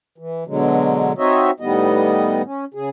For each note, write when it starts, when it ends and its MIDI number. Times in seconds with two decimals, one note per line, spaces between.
0.18 0.44 52
0.47 1.12 47
0.47 1.12 50
0.47 1.12 54
0.47 1.12 56
1.18 1.51 60
1.18 1.51 63
1.18 1.51 66
1.18 1.51 73
1.18 1.51 75
1.18 1.51 76
1.60 2.42 45
1.60 2.42 51
1.60 2.42 55
1.60 2.42 59
1.60 2.42 75
2.45 2.65 61
2.74 2.89 49
2.74 2.89 68